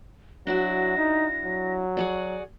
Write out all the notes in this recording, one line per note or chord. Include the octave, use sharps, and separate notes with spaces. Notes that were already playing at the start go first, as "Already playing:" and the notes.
F#3 D4 E4 F#4 A#6
D#4
F#3
F#4 G#4 D5